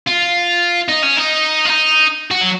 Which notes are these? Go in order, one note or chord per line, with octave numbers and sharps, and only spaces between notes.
F4
D#4
C#4
D#4
F4
D#4
F#4
F#3